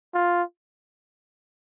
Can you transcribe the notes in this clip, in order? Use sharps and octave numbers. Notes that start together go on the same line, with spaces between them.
F4